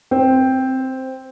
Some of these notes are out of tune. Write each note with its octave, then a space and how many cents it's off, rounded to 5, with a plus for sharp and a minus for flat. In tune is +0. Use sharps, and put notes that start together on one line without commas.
C4 +0